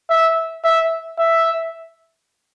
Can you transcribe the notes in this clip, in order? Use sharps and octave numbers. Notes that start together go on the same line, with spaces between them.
E5
E5
E5